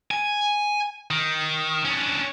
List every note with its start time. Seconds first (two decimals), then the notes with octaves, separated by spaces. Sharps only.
0.11 G#5
1.11 D#3
1.85 C#4 D4